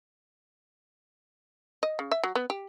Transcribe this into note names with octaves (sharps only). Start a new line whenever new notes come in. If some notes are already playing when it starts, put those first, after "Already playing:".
D#5
C#3
E5
F#3
B3
G4